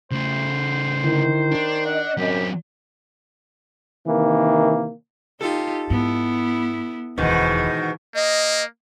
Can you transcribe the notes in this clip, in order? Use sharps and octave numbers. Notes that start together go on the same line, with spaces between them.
C#3 A3 C5
D3 D#3 E4
D4
D#5 F#5
F#2 F#3 C4 G4
C3 D#3 E3 A#3
D#4 F4 G4 A4
G#2 B3 E4
E1 D2 G#2 B2 D#3 E3
A#3 D#5